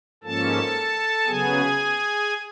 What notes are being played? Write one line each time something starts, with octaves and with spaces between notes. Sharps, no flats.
G#2 F3 A#3 C#4 A4 A5
C#3 F#3 B3 G#4 G#5